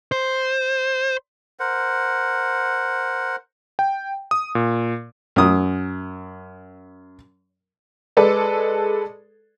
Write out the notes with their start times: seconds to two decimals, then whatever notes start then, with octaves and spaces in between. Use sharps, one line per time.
0.12 C5
1.60 A#4 C5 F#5
3.79 G5
4.31 D#6
4.55 A#2
5.36 F#2 D#6
8.17 G#3 A4 B4 D5